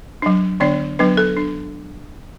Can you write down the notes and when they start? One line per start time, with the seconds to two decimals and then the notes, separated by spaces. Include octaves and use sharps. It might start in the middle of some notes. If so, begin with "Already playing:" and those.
0.22 F#3 D4
0.60 D3 B3 D4 D5
0.99 F#3 B3 D4 B4
1.17 A4
1.37 D4